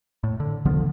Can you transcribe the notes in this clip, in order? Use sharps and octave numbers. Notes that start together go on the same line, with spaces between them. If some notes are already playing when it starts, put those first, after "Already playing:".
A2
D3
C2 D3 F3 B3